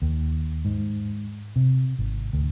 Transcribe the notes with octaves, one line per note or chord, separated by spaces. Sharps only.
D#2
G#2
C3
G#1
D2